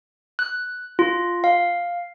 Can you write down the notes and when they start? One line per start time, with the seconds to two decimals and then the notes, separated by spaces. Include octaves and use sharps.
0.39 F#6
0.99 F4
1.44 F5